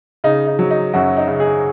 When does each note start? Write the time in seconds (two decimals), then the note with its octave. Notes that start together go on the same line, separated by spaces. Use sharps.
0.24 C#3 D#4
0.47 D#4
0.59 F#3
0.71 D#4
0.93 F#2 C#4 F#4
1.17 D#4
1.28 C#3
1.39 D#4 G#4